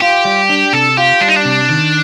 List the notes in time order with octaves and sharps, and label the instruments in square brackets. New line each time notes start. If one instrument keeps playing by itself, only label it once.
[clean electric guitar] F4 [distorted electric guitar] G4
[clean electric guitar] G3
D4
[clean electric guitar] C3 [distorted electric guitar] A4
[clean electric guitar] F4 [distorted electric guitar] G4
[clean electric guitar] G3 [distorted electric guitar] D4
[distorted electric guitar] D#4
D4
[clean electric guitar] C3
D#3